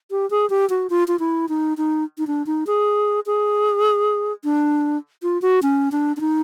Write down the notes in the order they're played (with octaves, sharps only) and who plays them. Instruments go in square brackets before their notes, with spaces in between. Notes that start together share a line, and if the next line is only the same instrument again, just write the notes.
[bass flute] G4
G#4
G4
F#4
F4
F4
E4
D#4
D#4
D#4
D4
D#4
G#4
G#4
D4
F4
F#4
C#4
D4
D4
D#4